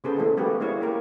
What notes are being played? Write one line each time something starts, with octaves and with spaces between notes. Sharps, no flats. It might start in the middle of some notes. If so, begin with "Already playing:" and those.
C#3 B3 G#4 A4 C5
D3 E3 A3
F#3 G#3 A#3 B3 F#4 G4
G3 A#3 E4 G#4 C#5
A#3 G4 A#4